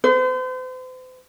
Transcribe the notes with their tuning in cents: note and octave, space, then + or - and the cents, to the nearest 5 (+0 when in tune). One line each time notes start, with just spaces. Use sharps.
C5 -40